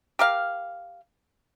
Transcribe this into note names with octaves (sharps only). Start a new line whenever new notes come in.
G4 A#4 F5